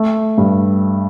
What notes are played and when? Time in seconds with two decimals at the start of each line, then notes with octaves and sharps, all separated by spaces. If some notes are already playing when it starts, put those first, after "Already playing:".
Already playing: A3
0.38 G2